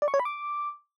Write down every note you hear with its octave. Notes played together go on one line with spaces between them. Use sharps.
D5
C#6
C#5
B5
D6